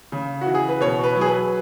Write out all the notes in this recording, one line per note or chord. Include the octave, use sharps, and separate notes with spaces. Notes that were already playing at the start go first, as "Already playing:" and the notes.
C#3
E3 F#4
G#4
B4
B2 C#5
B4
F#3
G#4
B4